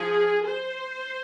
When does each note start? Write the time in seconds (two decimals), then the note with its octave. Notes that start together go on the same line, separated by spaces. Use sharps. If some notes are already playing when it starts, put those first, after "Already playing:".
Already playing: F3 G#4
0.45 C5